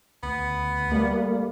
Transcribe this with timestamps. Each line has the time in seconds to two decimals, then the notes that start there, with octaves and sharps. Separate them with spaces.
0.23 D2 B3
0.91 G3 A3 A#3